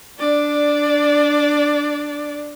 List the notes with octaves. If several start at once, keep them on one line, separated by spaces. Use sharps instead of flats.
D4 D5